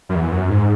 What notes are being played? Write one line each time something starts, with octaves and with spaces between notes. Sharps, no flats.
F#2
E2
F#2
G#2